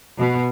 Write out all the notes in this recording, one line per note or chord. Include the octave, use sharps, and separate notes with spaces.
B2